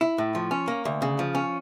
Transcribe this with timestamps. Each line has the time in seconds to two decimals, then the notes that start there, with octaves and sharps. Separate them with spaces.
0.01 E4
0.18 A2
0.35 F3
0.51 C#4
0.68 A#3
0.85 D2
1.02 C#3
1.19 F3
1.35 C#4